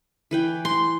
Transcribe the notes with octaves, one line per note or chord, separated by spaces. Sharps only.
E3 B4 G5
C6